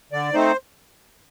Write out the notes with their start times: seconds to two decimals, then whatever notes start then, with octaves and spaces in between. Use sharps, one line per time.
0.12 D3 D5
0.34 A3 C4 D#4 C5